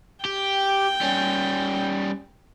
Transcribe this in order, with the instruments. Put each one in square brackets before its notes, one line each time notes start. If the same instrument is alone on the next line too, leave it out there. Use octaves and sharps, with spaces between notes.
[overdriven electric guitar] G4 [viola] G5
[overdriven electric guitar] G3 C#4